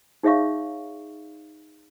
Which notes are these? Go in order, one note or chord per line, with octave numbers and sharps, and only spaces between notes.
D#4 G#4 C#5 E5 F5 C#6